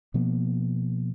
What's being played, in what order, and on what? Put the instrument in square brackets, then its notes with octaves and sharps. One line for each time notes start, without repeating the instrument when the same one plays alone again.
[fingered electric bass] B2 F3 A#3 B3